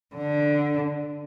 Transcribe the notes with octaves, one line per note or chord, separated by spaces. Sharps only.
D3